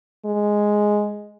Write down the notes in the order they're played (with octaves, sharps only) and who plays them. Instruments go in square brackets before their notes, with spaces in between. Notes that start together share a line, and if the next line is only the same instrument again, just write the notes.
[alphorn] G#3